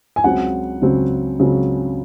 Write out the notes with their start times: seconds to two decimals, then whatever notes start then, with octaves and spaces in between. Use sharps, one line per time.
0.16 G#5
0.24 C#2 C#3 F#3 C4 F#5
0.82 C#2 C#3 F#3 C4
1.40 C#2 C#3 F#3 C4